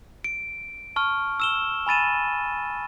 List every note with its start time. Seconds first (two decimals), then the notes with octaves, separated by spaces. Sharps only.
0.24 D7
0.96 A5 C#6 F6
1.40 E6 E7 G7
1.87 G#5 B5 A6 D#7 E7